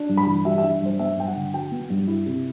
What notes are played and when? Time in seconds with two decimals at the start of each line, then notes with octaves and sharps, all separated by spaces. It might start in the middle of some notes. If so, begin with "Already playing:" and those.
Already playing: D4
0.09 G2
0.17 B5
0.26 E3
0.45 G3 E5
0.58 E5
0.64 D4
0.82 G2 C5
0.99 B3 E5
1.17 G2 G5
1.27 F#5
1.36 D3
1.53 F#3 G5
1.72 B3
1.90 G2
2.07 E4
2.26 C3